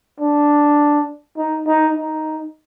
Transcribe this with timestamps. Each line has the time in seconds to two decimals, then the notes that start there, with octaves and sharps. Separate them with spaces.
0.20 D4
1.38 D#4
1.67 D#4
1.97 D#4